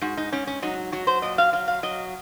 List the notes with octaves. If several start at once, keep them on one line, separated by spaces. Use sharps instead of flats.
G#2 F#4
D#4
G#2 C#4
C#4
F#3 D#4
F#3 F#4
C5
A#2 D#5
F5
F#3 F5
F5
F#3 D#5